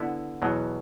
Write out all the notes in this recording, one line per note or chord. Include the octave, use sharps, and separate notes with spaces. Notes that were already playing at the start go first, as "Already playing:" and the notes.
Already playing: D3 B3 E4
E2 B2 F#3